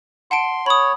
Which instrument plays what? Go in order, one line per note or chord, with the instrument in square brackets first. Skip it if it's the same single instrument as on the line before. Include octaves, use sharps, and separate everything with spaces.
[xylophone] F#5 A5 D7 [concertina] C6
[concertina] C#5 [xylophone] B5 D#6